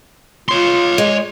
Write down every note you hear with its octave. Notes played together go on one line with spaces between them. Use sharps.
F4 C#5 C6
G#3